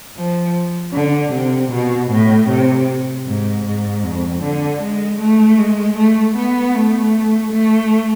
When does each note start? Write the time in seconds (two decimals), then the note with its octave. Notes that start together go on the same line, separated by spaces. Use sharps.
0.17 F3
0.94 D3
1.33 C3
1.72 B2
2.11 A2
2.50 C3
3.26 G#2
3.66 G#2
4.04 F2
4.43 D3
4.82 G#3
5.21 A3
5.59 G#3
5.97 A3
6.37 B3
6.75 A3
7.52 A3